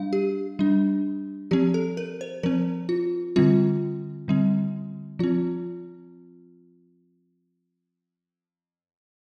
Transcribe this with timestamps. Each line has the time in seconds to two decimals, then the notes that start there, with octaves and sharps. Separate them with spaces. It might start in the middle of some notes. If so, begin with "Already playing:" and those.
Already playing: G3 D4 F5
0.13 G4
0.59 G3 D4
1.51 F3 C4 G4
1.74 A4
1.97 A#4
2.21 C5
2.43 F3 C4 A#4
2.89 F4
3.36 D3 G3 C4 F4
4.28 D3 G3 C4
5.19 F3 C4 F4